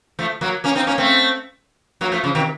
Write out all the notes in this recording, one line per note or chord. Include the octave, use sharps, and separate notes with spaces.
F3 A3
F#3 A#3
A#3 C#4
C4 D#4
A#3 C#4
A3 C4
F#3 A#3
F3 A3
C#3 F3
C3 D#3